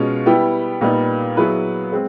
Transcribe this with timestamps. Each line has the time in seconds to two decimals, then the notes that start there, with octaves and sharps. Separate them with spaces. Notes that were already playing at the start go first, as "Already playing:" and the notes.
Already playing: B2 G#3 C#4 F4
0.26 G3 B3 E4 G4
0.81 A#2 G3 B3 D#4
1.37 F#3 B3 E4 G#4 B4
1.92 G#3 C4